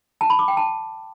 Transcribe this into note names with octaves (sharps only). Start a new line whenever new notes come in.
A5
B5
D6
G5
A5